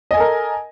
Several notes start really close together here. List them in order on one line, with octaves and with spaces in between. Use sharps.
D#5 G#5 A4 A#4